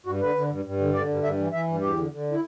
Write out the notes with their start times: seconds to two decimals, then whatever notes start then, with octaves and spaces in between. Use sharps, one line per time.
0.06 G2 F#4
0.21 D3 B4
0.35 D3
0.50 G2
0.65 G2
0.80 D3
0.94 D3 D5
1.09 G2
1.23 G2 E5
1.38 E3
1.52 E3 E5
1.68 G2
1.81 E2 G4
1.97 D3
2.11 D3
2.31 E4